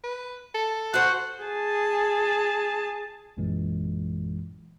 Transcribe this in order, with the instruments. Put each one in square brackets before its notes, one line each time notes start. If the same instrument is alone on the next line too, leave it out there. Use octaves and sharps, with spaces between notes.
[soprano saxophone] B4
A4
[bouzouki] F#4 C5 [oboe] F#5
[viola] G#4 A5
[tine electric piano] A1 F#2 A#2 E3 G#3